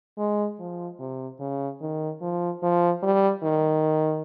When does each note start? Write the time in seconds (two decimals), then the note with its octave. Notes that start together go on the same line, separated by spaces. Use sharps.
0.18 G#3
0.60 F3
0.99 C3
1.40 C#3
1.81 D#3
2.22 F3
2.63 F3
3.03 G3
3.43 D#3